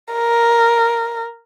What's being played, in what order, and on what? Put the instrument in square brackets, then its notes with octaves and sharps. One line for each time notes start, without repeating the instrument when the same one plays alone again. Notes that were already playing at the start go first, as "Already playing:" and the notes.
[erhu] A#4